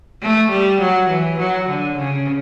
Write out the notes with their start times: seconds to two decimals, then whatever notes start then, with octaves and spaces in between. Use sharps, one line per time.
0.22 A3
0.51 G3
0.81 F#3
1.09 E3
1.38 F#3
1.68 D3
1.97 C#3